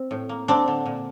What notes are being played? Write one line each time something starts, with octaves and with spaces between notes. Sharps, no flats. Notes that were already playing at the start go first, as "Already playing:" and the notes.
Already playing: C4
A2
A#3
F#3 C4 D4
D3
A#2